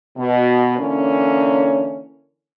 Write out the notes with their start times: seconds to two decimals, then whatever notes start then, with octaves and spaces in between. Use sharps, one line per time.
0.17 B2
0.79 D3 E3 A#3 C#4